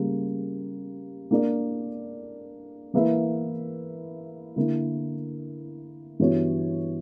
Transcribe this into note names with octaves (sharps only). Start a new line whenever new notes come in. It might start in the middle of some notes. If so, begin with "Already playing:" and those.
Already playing: C#3 G3 A#3
A#3 D4 A#4 D5
E3 A#3 E4 B4 E5
D3 A#3 E4 A#4
G2 E3 B3 F#4 C#5